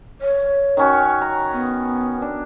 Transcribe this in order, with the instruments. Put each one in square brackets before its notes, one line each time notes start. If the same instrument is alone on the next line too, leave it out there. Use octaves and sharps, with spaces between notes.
[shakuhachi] C#5
[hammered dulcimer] D#3 C#4 F#4
A#5
[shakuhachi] B3
[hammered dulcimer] D4